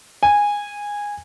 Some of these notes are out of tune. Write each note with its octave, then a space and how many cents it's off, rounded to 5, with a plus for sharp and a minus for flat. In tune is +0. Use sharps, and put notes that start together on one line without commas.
G#5 -15